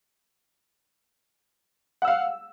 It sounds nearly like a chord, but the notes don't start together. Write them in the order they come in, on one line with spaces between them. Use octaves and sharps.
F#5 E6 F5